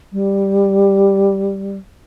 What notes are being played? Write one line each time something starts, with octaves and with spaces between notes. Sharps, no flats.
G3